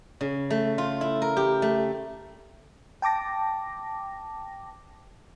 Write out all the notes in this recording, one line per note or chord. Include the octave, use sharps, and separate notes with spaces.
C#3
A3
F4
E4
A#4
G4
A3
G5 A5 D6 A#6